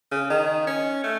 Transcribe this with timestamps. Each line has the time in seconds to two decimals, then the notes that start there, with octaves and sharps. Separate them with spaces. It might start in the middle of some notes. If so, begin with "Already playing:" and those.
0.12 C#3
0.30 D#3
0.67 C#4
1.04 A3